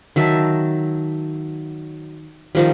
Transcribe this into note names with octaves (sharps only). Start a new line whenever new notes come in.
D#3 F#3 E5 A5
D#3 F3 G3